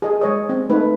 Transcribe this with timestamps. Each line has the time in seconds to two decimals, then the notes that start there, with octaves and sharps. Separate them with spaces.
0.02 G#4 D#5
0.21 G#3 C#5 D#5
0.49 C4
0.69 A3 D#4 B4